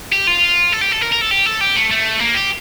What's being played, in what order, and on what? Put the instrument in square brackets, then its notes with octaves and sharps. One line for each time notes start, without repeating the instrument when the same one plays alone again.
[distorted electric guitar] G4
F4
A4
G4
A4
A#4
A#4
A4
G4
A4
G4
A3
A3
A#3
G4